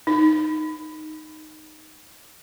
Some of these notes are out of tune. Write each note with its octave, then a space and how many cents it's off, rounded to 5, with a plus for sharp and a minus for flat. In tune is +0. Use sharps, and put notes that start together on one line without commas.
D#4 -5